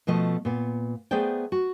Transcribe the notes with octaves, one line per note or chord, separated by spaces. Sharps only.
B2 F3 A3 D#5
A#2 B3
A3 B3 G#4 C5 D5 G5
F#4